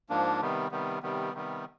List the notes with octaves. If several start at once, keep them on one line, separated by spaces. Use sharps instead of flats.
G#2 F3 A#3 D4
C3 D#3 G3 B3
C3 D#3 G3 B3
C3 D#3 G3 B3
C3 D#3 G3 B3